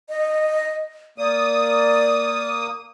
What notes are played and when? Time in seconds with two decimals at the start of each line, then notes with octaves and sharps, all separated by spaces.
0.09 D#5
1.18 A#3 D5 D#6